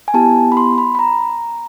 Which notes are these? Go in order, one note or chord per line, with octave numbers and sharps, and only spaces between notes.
G#5
B3 E4 G4 A5
B5
C6
B5
B5
A#5